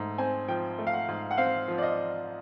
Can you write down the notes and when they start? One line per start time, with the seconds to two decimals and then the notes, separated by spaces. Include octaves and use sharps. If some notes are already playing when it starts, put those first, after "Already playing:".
Already playing: G#2 A3
0.18 C4 G#5
0.48 F3 G5
0.79 A3
0.87 F5
0.93 F#5
1.08 G#2
1.31 F#5
1.38 C4 F5
1.68 F3
1.78 D5
1.83 D#5